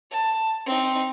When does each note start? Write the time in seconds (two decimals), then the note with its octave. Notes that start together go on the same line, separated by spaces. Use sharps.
0.11 A5
0.66 C4 D#4